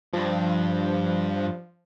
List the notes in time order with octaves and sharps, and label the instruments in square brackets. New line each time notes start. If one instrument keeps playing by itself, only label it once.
[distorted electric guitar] G2 [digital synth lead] F3